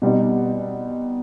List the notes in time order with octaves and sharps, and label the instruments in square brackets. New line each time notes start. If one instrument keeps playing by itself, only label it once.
[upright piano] B2 G3 C4 D#4